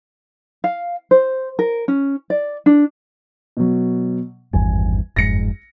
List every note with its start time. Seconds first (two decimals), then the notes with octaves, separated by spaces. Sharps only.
0.64 F5
1.11 C5
1.59 A#4
1.88 C#4
2.30 D5
2.66 D4
3.57 B2 F#3
4.53 G#1 E2 G2 G#5
5.16 F#1 F2 G#2 A#6 C#7